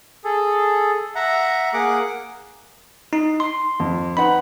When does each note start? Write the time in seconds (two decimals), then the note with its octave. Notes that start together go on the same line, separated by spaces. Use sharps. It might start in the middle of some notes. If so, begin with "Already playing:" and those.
0.24 G#4 A4
1.15 E5 F#5 A#5
1.74 A#3 G#4 F#5 D6
3.13 D#4
3.40 C6
3.80 F2
4.17 D#4 B4 F#5 B5